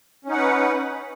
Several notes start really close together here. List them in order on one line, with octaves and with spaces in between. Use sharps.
C#4 D#4 F#5 B4